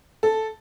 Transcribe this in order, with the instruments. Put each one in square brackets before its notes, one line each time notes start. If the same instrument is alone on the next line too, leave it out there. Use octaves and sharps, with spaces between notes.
[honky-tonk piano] A4